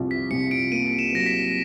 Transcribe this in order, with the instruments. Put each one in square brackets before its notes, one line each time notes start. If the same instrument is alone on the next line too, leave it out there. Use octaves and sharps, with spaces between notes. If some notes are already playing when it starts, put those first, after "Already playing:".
Already playing: [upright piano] C2 F3
[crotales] B6
[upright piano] C2 [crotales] C#7
[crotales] D7
[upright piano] A#3 [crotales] D#7
[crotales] E7
[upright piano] F#3 [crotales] A#6
[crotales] B6